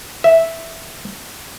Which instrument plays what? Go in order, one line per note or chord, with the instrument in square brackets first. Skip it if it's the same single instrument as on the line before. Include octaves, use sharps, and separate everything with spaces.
[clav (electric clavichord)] E5